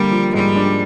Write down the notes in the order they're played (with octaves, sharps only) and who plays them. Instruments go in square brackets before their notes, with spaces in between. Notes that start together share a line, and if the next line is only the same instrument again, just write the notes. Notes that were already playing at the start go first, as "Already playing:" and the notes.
Already playing: [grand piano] D3 A#3 [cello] G3
[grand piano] F3
[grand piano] G#2 [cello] G3
[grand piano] D4